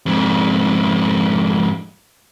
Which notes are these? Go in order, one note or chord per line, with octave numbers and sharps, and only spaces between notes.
F2 G#2